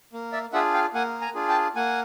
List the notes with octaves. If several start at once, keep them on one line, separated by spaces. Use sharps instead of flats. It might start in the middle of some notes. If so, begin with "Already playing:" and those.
A#3
D5 E5
D4 F4 G#4 E5 F#5
F5 G5
A#3 F#5 G#5
G#5 A#5
D4 F4 G#4
G5 A5
A#3 F#5 G#5